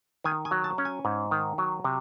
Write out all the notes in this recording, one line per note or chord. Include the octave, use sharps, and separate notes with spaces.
D#3 G#5
G#5
F#3
A5
C#4
G#5
G#2
D#3
F#3
C3